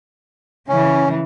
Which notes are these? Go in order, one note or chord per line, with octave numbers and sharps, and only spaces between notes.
C#3 E3 C#4